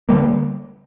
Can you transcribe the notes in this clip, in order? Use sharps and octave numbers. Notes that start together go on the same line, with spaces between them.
D3 G3 A#3